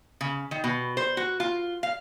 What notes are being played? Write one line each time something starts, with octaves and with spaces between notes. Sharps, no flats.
C#3
D#3
B2
C5
F#4
F4
F5